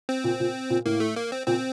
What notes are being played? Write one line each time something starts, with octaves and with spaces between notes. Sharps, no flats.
C4
A#2
A#2
A#2
A2 A#3
A3
A#3
C4
A#2 C4